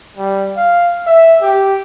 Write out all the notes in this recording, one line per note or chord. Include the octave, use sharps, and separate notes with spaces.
G3
F5
E5
G4